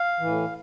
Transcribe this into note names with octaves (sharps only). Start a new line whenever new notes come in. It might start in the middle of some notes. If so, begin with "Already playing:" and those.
Already playing: F5
A2 E3